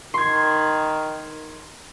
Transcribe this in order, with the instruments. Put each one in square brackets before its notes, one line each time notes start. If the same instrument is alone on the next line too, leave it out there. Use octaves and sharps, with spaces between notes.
[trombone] D#3 [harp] C6 G#6